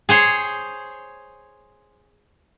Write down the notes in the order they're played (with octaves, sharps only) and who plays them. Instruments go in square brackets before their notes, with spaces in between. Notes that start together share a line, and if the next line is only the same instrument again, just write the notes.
[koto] G#4 C5 C#5